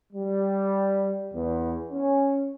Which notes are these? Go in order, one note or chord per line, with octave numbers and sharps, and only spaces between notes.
G3
E2
C#4